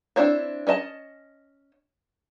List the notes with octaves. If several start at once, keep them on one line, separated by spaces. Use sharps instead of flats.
C4 D4 E4 C5 C#5
C#4 D4 D#5 A5